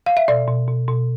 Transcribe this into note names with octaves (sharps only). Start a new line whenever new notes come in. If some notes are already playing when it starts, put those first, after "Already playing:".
F5
E5
B2 D5
B2
B2
B2